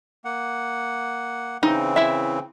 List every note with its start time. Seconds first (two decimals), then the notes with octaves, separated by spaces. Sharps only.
0.25 A#3 F#5
1.63 C#3 E3 C4 D#4
1.96 E4 E5